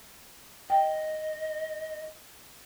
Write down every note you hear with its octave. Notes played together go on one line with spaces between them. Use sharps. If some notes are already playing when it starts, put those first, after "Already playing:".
D#5 G5